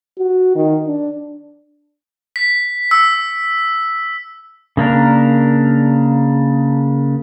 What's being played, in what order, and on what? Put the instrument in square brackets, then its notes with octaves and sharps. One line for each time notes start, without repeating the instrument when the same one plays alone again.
[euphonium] F#4
D#3
D4
[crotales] B6
E6
[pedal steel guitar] C#3 A#3 D4 A#4